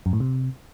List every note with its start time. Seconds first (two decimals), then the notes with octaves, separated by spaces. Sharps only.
0.06 F#2
0.13 A2
0.20 C3